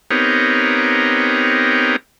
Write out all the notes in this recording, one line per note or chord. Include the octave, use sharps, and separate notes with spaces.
B3 C4 D#4 G4 A#4 C#5